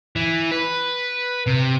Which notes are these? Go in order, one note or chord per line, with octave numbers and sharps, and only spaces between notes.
E3
B4
C3